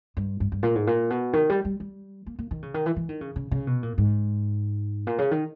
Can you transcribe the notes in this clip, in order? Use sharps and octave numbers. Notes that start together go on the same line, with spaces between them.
G2
G2
G2
A#2
G#2
A#2
B2
D#3
G3
G3
G3
A#3
A#3
D#3
C#3
D#3
E3
E3
D#3
C#3
C#3
C#3
B2
A#2
G#2
A#2
C#3
D#3